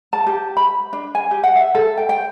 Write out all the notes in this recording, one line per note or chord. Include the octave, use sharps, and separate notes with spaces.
A5
G4
B5
D4
G#5
G4
F#5
E5
A4
G5
G5